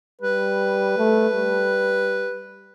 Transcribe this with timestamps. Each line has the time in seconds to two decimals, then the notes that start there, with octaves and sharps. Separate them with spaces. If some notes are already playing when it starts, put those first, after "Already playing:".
0.22 G3 B4
0.98 A3
1.33 G3